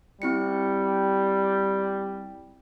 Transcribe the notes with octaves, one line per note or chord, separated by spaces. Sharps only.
G3 C4 E4 C#7